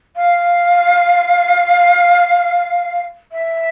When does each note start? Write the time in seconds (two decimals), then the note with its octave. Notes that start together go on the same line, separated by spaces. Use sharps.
0.16 F5
3.32 E5